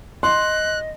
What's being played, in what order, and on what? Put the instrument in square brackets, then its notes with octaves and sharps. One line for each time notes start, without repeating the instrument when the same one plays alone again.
[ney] D#5 [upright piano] C6 [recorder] F#6